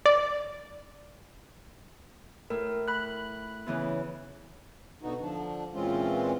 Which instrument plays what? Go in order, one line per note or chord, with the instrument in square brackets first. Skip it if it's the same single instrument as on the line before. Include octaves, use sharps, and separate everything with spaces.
[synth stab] D5
[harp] A2 [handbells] A#4
[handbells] B5 F#6
[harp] C#3 E3 B3
[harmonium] B2 D3 B3 D#4 F#4
D3 F3 D4
A#2 E3 G#3 C4 C#4 F4